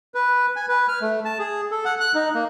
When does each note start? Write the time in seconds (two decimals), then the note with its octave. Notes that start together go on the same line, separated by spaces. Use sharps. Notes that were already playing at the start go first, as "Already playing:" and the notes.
0.14 B4
0.56 G#5
0.69 B4
0.88 F6
1.01 A3
1.25 A5
1.39 G#4
1.71 A4
1.85 F#5
2.00 F#6
2.15 D#4
2.35 A#3